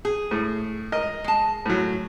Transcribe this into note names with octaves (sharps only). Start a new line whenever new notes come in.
G#4
A2
A#4 D#5
G#3 A5
A2 F#3